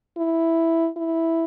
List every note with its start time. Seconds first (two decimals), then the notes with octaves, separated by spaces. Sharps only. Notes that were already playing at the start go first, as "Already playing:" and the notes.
0.17 E4
0.97 E4